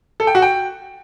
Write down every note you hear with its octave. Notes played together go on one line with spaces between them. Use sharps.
A4
G5
F#4
G5